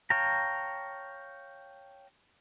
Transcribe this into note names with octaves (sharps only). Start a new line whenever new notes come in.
C#5 F5 G5 A5 A#5